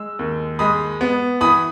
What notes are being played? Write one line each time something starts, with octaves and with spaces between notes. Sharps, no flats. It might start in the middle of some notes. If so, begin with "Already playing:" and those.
Already playing: G#3 E6
D#2
G#3 B5 D#6
B3
E3 B5 D#6